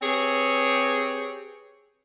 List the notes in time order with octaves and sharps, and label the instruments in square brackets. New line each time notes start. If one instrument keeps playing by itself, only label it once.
[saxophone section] C4 G4 G#4 B4 C#5